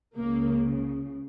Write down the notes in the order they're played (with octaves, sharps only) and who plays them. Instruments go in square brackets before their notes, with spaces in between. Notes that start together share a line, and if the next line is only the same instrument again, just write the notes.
[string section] C#2 C#3 A#3